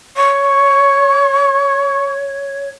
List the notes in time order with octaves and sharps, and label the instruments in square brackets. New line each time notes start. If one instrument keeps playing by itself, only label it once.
[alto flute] C#5 [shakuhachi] C#6